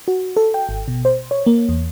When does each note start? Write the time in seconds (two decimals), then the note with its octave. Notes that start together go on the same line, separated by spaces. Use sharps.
0.08 F#4
0.37 A4
0.54 G5
0.69 G#1
0.88 B2
1.05 C5
1.31 C#5
1.46 A#3
1.69 E2